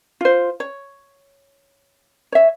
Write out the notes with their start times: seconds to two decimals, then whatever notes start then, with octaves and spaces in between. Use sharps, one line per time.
0.21 F4 C5
0.60 C#5
2.32 C#5 E5